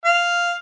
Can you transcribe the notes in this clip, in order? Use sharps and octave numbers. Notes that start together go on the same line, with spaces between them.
F5